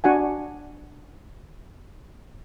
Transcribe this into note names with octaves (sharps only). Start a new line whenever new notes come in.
D4 F#4 F#5 G#5